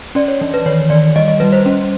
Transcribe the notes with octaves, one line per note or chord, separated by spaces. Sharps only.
C#4 D5
C#5
E3
B4
D#3 C#5
D#3 D5
G3 D#5
D#5
G3 B4
C5
C#4